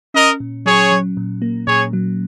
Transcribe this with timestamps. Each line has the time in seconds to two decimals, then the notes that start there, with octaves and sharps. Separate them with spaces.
0.14 C#4 A#4 D#5
0.40 A#2
0.66 F#3 G#4 C#5
0.92 F#3
1.17 A#2
1.42 A#3
1.67 A#2 G#4 C#5
1.93 F#3